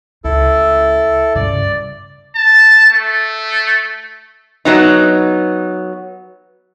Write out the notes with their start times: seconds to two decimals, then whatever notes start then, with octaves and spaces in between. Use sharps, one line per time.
0.24 C#2 E4 A4
1.36 G2 C#3 D5
2.36 A5
2.92 A3
4.65 F#3 B3 D#4